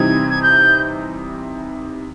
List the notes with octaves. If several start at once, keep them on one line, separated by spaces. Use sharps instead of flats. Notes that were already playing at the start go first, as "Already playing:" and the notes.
Already playing: C3 E3 G3 C4 D#4 G#6
G#6
G6